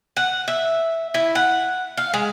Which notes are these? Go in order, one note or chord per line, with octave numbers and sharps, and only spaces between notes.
F#5
E5
E4
F#5
F5
G#3